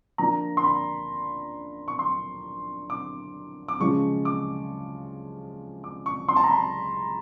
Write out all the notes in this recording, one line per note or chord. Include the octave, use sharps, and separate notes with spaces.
F3 A#3 D4 F4 A#5
C6
B5
C#6
C6
D6
D6
C#3 F3 G#3 C#6
D6
D6
C#6
C6
A5
A#5
B5